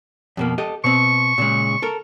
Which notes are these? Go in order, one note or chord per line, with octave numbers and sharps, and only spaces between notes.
F2 B2 A#3
G4 A4 D#5
B2 C4 C#6
A#2 C#3 G#3
A4 A#4